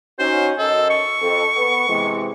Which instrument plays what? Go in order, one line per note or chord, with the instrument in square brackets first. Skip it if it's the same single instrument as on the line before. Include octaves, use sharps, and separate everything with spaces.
[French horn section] C#4 D#4 F#4 [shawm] C5
[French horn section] F#2 D#5 [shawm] A4
[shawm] C#6
[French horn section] F2 A4
B3
C3 E3 G#3